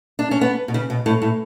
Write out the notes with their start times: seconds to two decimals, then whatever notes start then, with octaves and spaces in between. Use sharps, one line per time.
0.19 D4
0.31 C#4
0.41 B3
0.68 B2
0.74 C#3
0.90 B2
1.06 A2
1.22 A2